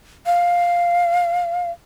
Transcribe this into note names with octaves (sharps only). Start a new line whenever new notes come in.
F5